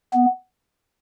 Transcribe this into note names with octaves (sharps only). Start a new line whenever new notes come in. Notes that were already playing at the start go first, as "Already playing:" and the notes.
B3